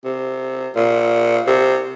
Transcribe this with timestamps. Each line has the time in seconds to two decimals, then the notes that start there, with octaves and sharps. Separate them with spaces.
0.05 C3
0.76 A#2
1.47 C3